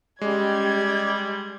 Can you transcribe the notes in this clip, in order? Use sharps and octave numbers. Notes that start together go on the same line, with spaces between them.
G3 G#3 C#4 G4 D5 D#5 G#6